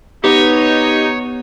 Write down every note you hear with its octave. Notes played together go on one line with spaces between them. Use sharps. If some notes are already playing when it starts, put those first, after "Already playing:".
B3 D#4 G4 C#5